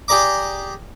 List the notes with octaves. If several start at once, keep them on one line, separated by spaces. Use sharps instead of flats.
G4 G#4 D5 A#5 D6